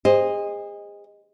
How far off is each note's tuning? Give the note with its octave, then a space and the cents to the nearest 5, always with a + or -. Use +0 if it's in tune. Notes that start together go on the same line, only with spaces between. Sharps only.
G#4 -40 C5 +0 D#5 +0